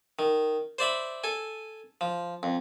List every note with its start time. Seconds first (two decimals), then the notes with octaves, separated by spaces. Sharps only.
0.19 D#3
0.79 C5 D5 E5 B5
1.24 A4 G#5
2.01 F3
2.43 F2